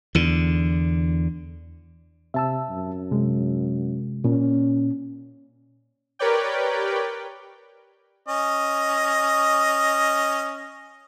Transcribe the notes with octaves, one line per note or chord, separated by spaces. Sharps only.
E2 D3
C3 E5 A5 E6
F#2
C3 G#3
A#2 C#4
G4 A#4 B4 C#5 D5 G5
C#4 D#5